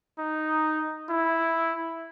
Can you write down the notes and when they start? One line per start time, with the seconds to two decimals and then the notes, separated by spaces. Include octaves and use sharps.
0.18 D#4
1.10 E4